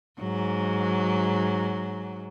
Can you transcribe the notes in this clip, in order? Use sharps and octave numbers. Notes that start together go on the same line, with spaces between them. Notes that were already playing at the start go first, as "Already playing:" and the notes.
G#2 F#3